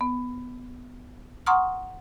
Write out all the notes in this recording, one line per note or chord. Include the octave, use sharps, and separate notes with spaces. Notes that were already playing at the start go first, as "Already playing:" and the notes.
B3
F#5 A#5 C6 C#6 D#6 F6